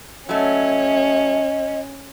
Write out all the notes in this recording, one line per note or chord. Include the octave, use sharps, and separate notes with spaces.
F#3 A3 C#4 D#5